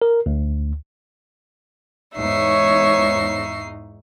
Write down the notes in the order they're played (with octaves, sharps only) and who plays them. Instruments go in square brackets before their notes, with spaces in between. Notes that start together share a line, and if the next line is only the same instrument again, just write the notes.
[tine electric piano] A#4
D2
[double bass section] E2 G#2 [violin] D#4 C7 [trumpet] C#5 [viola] E5 C#6